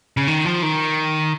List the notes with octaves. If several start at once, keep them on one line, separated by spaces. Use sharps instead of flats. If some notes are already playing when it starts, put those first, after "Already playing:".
C#3
D#3
F3
D#3